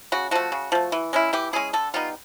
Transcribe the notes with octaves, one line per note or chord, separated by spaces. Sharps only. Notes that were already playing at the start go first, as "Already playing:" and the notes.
C#3 F#4
F3 A3 F#4
C#3
F3 A3
E3
G#3 C#4 E4
E3 G4
G#3 C#4 E4 G#4
D3 A4
G3 B3 D#4 F4